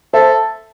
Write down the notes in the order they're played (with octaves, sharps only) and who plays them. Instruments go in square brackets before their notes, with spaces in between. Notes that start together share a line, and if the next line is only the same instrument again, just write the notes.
[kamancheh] A4 [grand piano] C5 E5